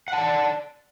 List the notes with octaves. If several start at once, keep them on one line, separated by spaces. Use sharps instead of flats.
D5 F#5 A5